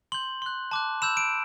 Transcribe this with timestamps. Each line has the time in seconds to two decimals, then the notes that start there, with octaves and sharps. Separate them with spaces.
0.12 C6 G6 F#7
0.42 C6 F#6
0.71 A5 D6 F#6
1.02 B5 E6 G6 E7
1.17 D7